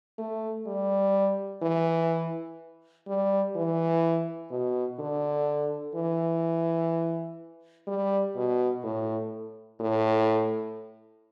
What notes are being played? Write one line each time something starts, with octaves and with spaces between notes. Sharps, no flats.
A3
G3
E3
G3
E3
B2
D3
E3
G3
B2
A2
A2